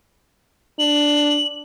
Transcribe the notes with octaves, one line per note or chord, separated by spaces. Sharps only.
D4 F#7